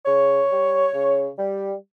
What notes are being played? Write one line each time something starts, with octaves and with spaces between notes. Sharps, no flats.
C#3 C#5
G3
C#3
G3